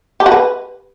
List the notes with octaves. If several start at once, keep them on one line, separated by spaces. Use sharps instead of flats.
G4
F#4
B4